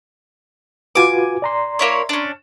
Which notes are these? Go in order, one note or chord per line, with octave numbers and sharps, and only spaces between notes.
F4 F#4 B4 G#5 D6
D5 A#5 C6
A#3 E4 C#5
C#4 D4